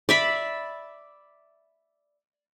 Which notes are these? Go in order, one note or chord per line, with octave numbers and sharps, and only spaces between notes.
D5 E5 B5